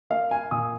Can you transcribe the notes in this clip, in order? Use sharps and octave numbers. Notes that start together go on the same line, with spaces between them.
A#3 F5
G#5
A#2 D#6